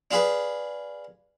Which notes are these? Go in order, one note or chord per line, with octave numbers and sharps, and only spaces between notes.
D4 F4 G#4 B4